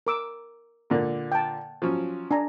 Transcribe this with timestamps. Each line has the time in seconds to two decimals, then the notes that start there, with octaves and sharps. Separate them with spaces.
0.07 A#4 D6 E6
0.90 A#2 D3 A#3
1.32 G5 A5
1.82 F3 F#3 C#4
2.31 D4 G#5 A#5